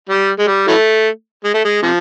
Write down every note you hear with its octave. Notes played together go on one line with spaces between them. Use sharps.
G3
G#3
G3
E3 F#3 A3
G#3
A3
G#3
C3 F3